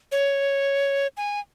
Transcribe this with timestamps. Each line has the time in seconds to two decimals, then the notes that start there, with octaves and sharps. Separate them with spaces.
0.12 C#5
1.17 G#5